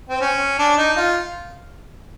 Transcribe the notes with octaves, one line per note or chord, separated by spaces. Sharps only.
C4
C#4
D4
D#4
F4